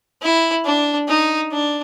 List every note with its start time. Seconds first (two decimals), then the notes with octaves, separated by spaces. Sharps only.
0.22 E4
0.65 D4
1.08 D#4
1.52 D4